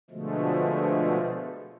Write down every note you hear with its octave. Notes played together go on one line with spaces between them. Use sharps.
B2 D3 F3 G#3 A3